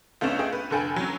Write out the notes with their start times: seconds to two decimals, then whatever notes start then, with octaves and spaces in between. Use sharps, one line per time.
0.21 C#2 A3 B3 C#4 D4 E7
0.39 A3 G#4 D#5 G5
0.52 B4
0.70 F1 D3 A4 G5 G#5 B5
0.96 F#3 C#4